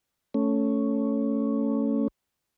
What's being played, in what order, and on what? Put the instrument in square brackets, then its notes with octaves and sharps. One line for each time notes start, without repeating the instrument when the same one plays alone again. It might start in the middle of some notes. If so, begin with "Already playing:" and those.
[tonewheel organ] A3 C#4